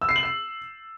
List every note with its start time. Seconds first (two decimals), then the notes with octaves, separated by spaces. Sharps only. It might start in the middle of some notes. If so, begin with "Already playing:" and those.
0.02 E6
0.09 C7
0.16 F#7
0.23 C7